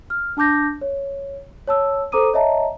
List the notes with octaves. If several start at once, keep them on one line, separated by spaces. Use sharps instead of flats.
F6
D4 A5 D6 G6 A#6
C#5
C#5 A5 E6
A4 C5 A#5 D6 D#6 D#7
C#5 D#5 E5 A5 A#5